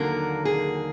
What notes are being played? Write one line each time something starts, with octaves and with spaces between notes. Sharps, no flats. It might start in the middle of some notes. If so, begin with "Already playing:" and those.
Already playing: D#2 D3 F#3 A#3 A#4
G#4